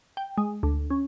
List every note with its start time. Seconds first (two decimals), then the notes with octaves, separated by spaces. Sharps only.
0.17 G5
0.38 G#3
0.63 D2
0.90 C#4